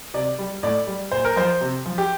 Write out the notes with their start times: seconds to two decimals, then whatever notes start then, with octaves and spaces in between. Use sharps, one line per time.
0.14 C3 D5
0.39 G3
0.63 A2 D5
0.87 G3
1.12 A#2 C5
1.25 A#4
1.36 F3 C5
1.61 C3
1.86 F3
1.98 G4